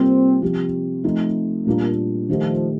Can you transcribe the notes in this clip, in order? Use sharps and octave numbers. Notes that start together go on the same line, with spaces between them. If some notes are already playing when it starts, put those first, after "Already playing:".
Already playing: C3 G3 A#3 C4 F4
C3 F3 C4 G4
F3 A3 C4 D#4
A#2 G3 A#3 D4 F4
D#3 F3 A3 D#4 G4